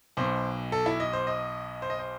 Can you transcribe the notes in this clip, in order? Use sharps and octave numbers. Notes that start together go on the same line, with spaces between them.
B1 B2 C5
A4
E4
D#5
C5
D#5
C5
D#5
C5